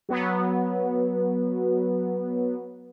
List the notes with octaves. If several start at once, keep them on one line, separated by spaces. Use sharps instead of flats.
F#3 B3